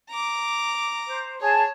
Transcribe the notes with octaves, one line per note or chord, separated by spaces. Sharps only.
A#5 D6
C5
G#4 C#5 A5